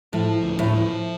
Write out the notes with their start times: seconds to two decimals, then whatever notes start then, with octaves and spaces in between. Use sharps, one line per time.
0.13 A2 F3
0.43 D2
0.59 A2
0.74 F3